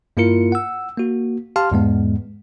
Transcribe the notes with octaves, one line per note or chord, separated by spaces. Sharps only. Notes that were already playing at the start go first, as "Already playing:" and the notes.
G2 A#3 E4 F4 A#4 C#7
F#5 E6
A#3 F#4
G4 F5 A5 C6 F6
E2 G#2 G#3 B3